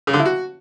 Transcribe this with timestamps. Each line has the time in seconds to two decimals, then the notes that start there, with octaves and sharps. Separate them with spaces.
0.07 C#3
0.13 D3
0.19 E4
0.25 F#4